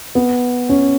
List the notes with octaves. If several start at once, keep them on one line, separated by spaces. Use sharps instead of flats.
B3
C#4